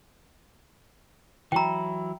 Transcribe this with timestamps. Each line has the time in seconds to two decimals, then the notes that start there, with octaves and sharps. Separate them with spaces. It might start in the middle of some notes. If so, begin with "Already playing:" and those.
1.52 E3 F#3 E4 G5 A#5